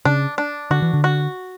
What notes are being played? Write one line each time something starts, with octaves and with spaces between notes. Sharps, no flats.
C#3 D4
D4
D3 F#4
E3
D3
F#4